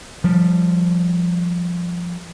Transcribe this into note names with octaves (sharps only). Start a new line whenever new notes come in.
F3 G3